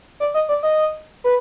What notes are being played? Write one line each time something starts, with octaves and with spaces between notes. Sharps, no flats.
D5
D#5
D5
D#5
B4